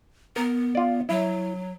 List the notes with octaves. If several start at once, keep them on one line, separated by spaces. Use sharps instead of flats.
B3 A#4
F4 D5
F#3 E4